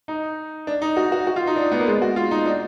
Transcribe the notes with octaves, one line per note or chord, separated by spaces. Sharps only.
D#4
D4
D#4
F#4
F#4
F#4
F4
D#4
D4
B3
A#3
G#3
F#4
F4
D#4
D4